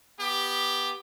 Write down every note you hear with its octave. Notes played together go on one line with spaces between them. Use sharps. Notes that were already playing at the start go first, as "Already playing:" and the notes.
B3 G4